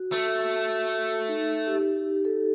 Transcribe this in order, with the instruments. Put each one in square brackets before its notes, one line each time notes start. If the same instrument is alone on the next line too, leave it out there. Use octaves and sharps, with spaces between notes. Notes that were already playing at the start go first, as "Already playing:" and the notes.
Already playing: [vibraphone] F#4
[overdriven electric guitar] A3
[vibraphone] D#4
G4
A4